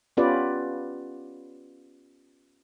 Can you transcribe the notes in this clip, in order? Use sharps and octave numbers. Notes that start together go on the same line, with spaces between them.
B3 C#4 F4 G4 B4 D5